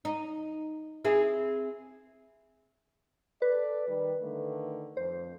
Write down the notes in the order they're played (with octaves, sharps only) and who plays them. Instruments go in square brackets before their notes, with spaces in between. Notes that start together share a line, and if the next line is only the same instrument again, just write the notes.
[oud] D#4
C4 E4 G#4
[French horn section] A4 D5 [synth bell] B4
[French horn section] D#3 G3
D3 D#3 A3
[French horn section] F2 [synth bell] C5